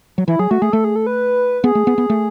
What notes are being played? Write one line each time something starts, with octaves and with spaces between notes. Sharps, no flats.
F#3
E3 E4
F#3 G#4
A3 F#4
A3 G#4
A3 A4
G#4
A4
B4
B3 G#4
A3
B3
B3
A3